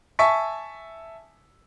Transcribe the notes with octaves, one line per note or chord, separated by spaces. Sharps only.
E5 G#5 A5 C#6 B6